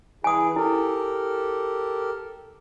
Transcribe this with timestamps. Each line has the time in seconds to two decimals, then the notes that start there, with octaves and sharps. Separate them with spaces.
0.24 E3 E4 G#4 G#5 D#6
0.56 E4 G4 A4 A#4